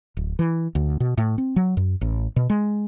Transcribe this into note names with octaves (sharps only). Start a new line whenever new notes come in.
D1
E3
D2
B2
A2
C4
F#3
F#2
A1
B2
G#3